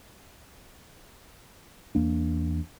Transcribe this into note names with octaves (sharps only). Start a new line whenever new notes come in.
E2 A#3 D4